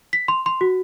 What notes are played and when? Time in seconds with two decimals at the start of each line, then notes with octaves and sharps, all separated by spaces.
0.13 B6
0.28 C6
0.46 C6
0.61 F#4